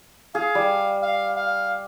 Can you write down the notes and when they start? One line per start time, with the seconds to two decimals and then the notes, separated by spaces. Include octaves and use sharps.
0.35 G#4 F5
0.55 G3
1.02 F5
1.36 F5